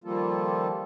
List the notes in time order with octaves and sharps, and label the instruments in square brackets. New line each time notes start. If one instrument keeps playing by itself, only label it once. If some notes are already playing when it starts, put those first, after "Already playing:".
[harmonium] D#3 F3 G3 A#3 F4 A4